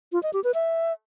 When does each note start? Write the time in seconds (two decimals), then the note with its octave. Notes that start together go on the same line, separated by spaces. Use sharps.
0.12 F4
0.23 D#5
0.33 G4
0.44 B4
0.54 E5